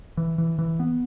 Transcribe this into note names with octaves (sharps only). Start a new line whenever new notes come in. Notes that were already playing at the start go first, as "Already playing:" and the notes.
E3
E3
E3
B3